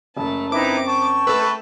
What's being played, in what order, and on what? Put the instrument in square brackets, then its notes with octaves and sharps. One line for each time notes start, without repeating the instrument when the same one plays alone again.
[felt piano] F#1 [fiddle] A3 A5
[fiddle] C4 [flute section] D#4 E4 B4 [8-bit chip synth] D6
[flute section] G5 A5 C#6
[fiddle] A3 [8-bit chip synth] A4 B4 [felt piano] E6